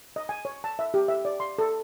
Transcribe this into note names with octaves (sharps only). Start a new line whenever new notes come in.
D#5
G#5
C#5
A5
E5
G4
E5
D5
C6
A4